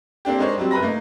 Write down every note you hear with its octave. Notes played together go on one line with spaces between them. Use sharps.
A#3 C4 D4 G4
G#3 D4 D#4 A#4 C5 C#5
F#3 G3 C4
F#1 B4 A#5 B5 A#6
A3 A#3 D#4